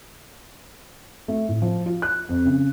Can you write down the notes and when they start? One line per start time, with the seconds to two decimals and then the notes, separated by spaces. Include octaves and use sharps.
1.28 A3
1.49 A2
1.62 F3
1.86 F4
2.02 F#6
2.29 F2
2.45 C#3